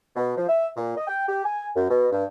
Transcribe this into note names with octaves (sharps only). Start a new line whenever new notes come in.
B2
F3
E5
A#2
D#5
G5
G4
G#5
F#2
B2
G2